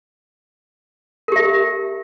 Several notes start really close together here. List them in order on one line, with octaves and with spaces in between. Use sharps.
A#4 G4 E5